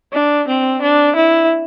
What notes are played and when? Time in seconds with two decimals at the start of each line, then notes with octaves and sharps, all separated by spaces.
0.13 D4
0.48 C4
0.82 D4
1.16 E4